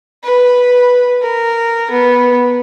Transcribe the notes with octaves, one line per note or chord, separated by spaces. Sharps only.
B4
A#4
B3